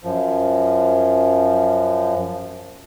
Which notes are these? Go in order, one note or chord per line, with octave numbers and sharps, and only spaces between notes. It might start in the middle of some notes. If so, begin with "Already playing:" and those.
F#2 F3